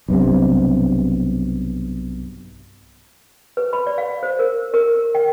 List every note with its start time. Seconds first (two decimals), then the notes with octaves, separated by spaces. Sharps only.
0.08 B1 G2 C3
3.57 B4
3.73 B5
3.87 D5
3.98 F5
4.23 C5
4.39 A#4
4.74 A#4
5.15 G5